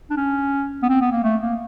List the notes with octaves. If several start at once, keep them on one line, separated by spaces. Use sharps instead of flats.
D4
C#4
B3
C4
B3
A#3
A3
A#3